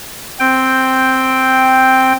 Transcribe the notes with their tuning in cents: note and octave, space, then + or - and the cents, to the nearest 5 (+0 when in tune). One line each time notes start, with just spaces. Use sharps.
C4 +0 G5 +0